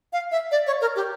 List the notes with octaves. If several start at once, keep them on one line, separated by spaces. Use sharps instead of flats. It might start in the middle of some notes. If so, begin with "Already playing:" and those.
F5
E5
D5
C#5
A#4
G4